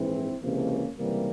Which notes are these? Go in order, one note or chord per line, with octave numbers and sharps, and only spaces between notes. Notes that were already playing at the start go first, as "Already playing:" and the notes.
Already playing: A#1 G#2 E3 C4 E4
C#2 C3 E3 A#3 C#4
C#2 C3 E3 G3 A#3